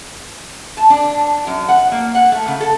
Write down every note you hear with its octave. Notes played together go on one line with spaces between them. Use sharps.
A5
D4
F#2
F#5
A#3
F#5
A3
C#3
A4